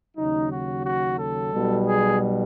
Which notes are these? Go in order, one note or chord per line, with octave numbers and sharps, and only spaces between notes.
D#2 C#3 F#3 D#4
F#4
F#4
A4
B1 B2 G3
G#4